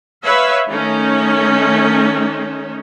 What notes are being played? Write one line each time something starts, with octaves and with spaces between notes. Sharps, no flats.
B4 C#5 E5 F5
D#3 A3 C#4 D#4 C#5